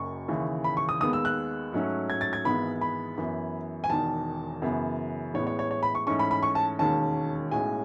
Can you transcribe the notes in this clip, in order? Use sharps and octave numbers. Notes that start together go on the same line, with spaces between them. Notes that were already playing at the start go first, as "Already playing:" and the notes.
Already playing: F#1 F#2 C#6
D#2 C#3 E3
B5
C#6
D#6
D#2 D#3 G#3 B3 D#6
E6
F#6
G#2 F#3 A3 C#4
G#6
A6
G#6
G#1 G#2 E3 G#3 B3 B5
B5
F#2 E3 B3
G#5
E1 E2 D#3 A5
F#2 C#3 E3 B3
A1 A2 G#3 B3 C#5
C#5
C#5
C#5
B5
C#6
G#2 E3 A3 C#4 C#6
B5
B5
C#6
A5
E1 D#2 D#3 G#3 C#4 A5
B1 A2 G#3 C#4 G#5